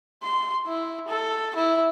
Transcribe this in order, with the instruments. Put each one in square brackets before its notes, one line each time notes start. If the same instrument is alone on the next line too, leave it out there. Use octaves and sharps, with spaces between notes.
[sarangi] C6
E4
A4
E4